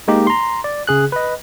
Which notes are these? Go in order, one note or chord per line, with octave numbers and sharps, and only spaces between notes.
G#3 A#3 D#4 G4
A#5 C6
D5
C#3 G#4 F#6
B4 D#5